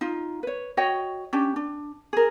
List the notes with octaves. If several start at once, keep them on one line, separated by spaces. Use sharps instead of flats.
D#4 F4
B4 C#5
F#4 C#5 D#5 G5
C#4 D4 G4
D4
G#4 A#4